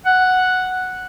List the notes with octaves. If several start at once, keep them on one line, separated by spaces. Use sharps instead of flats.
F#5